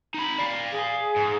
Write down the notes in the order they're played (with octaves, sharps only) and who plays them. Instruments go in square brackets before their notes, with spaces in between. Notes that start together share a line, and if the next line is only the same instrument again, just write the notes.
[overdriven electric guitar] D#4 B5
D5 F5
[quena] G#4
[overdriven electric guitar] G#2